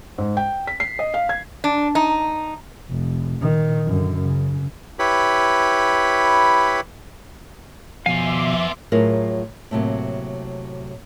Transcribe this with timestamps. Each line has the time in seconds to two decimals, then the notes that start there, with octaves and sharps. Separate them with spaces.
0.18 G#2
0.37 G5
0.67 B6
0.80 C7
0.99 D#5
1.14 F5
1.29 G#6
1.64 D4
1.95 D#4
2.89 F1
3.41 A#2 D#3
3.85 F#2 D3
4.19 C#3
4.99 E4 G4 B4 C#5 B5
8.06 B2 F3 B3 E5 F5 G#5 C6 D6
8.92 A2 F#3 F4 G#4 A#4
9.71 A2 C3 F#3 A#3